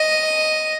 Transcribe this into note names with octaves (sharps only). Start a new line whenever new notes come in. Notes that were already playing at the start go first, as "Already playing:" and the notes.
Already playing: D#5